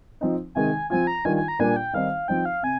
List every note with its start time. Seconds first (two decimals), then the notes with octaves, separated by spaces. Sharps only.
0.21 F3 C4 D#4
0.55 C3 D#3 G#3 G#5
0.90 F3 C4 F4 G#5
1.07 A#5
1.25 D#3 G3 D4 F4 G#5
1.36 G#5
1.48 A#5
1.59 A#2 G3 A#3 D4 F4 G#5
1.76 G5
1.93 D#3 G3 C4 D#4 F5
2.28 F3 C4 D#4 G5
2.45 F5
2.63 C3 G#5